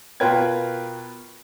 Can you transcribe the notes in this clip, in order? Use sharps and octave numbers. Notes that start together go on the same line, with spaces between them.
B2 F4 A#4 B4 G5 G#6